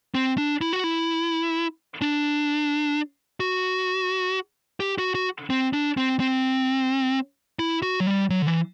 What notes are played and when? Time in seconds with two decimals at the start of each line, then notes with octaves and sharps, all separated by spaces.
0.15 C4
0.38 D4
0.61 E4
0.73 F#4
0.84 E4
2.02 D4
3.40 F#4
4.80 G4
4.98 F#4
5.15 F#4
5.50 C4
5.73 D4
5.97 C4
6.20 C4
7.59 E4
7.82 F#4
8.00 F#3
8.07 G3
8.30 F#3
8.42 D3
8.47 E3